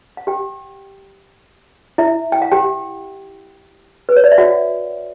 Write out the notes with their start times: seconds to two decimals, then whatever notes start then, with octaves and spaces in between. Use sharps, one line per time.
0.17 F#5
0.27 G4 G5
1.98 E4 E5
2.32 G5
2.42 F#5
2.52 G4 G5
4.09 B4
4.16 C#5
4.24 D5
4.32 E5
4.38 F#4 F#5